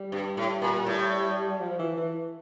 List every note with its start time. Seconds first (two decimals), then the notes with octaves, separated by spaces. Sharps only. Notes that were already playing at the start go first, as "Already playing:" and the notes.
Already playing: G3
0.12 G2
0.37 A2
0.62 A#2
0.76 A#2
0.86 A2
1.60 F3
1.79 E3
1.97 E3